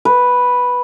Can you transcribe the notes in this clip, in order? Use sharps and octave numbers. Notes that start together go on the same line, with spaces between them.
B4